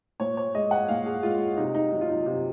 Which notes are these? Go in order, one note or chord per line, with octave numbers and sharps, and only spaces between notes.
A#2 C#5
C#5
G#3 D#5
F#5
A#2 F5
G#4
G#3 F4
C3 D#4
D#4
F#3 D#4
F4
D#4
C3 F4